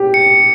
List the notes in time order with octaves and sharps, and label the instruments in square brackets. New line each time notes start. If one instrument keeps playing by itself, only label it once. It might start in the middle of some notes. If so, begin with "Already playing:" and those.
Already playing: [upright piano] G4
[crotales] C#7